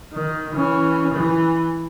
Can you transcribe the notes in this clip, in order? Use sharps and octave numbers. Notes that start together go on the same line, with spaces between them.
D#3
E3 C#4
E3